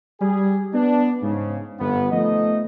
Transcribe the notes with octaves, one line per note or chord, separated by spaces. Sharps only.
G3 G#4
B3 D4
G#2 C#3
G1 B3
F3 A3 B3 D#4 D#5